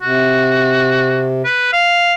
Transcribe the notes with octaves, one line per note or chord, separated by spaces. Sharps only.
C3 F#4
B4
F5